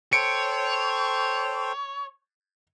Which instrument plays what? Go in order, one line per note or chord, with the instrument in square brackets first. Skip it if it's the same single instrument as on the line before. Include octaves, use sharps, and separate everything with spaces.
[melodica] A4 C5 G5 [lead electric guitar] C#5 [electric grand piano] C#7 D7